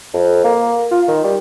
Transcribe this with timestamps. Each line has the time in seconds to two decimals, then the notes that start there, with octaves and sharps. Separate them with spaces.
0.14 F2
0.45 A#3
0.92 F4
1.08 D#3
1.25 G3